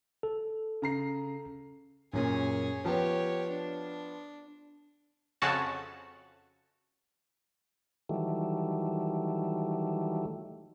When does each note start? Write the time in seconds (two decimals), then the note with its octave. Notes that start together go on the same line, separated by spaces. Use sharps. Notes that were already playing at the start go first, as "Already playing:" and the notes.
0.23 A4
0.82 C#3 A#5 C7
2.13 F#2 A#2 C#4 G#4
2.85 F3 B3 G4 C#5
3.49 D4
5.42 F2 C#3 C#4 F#4 A5
8.09 D#3 E3 F#3 G3 A3